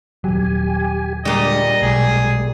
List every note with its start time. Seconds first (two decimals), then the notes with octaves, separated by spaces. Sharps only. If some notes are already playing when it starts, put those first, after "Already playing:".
0.24 D#1 B1 F#3 G4 G#5
1.25 A#2 D3 G3 G#3 D#5
1.82 B1 G#3 G#4